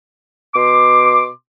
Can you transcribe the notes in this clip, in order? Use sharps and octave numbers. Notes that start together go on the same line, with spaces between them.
B2 C6 D6